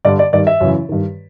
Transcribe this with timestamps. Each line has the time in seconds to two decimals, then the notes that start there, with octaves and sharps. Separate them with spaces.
0.05 G2 D3 D5
0.19 D5
0.33 G2 D#3 D5
0.47 E5
0.60 F#2 C#3 E3
0.89 G2 D#3